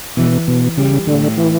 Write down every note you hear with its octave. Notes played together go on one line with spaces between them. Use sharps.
B2 E3
B2
C#3 G3
A2 D3
E3